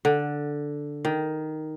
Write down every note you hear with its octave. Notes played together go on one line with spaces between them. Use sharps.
D3
D#3